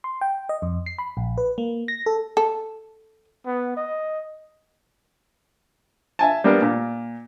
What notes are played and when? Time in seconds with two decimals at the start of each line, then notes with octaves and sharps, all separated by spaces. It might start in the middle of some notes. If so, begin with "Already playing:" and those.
0.04 C6
0.21 G5
0.49 D#5
0.62 F2
0.86 C7
0.98 B5
1.17 A#1
1.38 B4
1.58 A#3
1.88 A#6
2.06 A4
2.37 A4
3.46 B3
3.77 D#5
6.19 E5 G#5 A5
6.44 G3 A#3 B3 D4
6.62 A#2